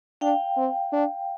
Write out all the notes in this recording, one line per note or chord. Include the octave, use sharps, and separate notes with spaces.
D4 F5 G5
C4
D4